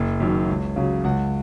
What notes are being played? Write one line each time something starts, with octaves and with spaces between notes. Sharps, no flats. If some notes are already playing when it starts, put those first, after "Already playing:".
Already playing: F#1
F#2 D#3 F#3
C#2
C#3 F#3
C#2 F#5